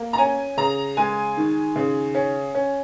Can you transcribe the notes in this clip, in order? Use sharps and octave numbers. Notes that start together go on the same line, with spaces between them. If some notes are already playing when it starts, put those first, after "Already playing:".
Already playing: A#3
A#5
C#4 G#5
C#3 A#5
G#3 G#5
D#3
C#3
C#4
C#4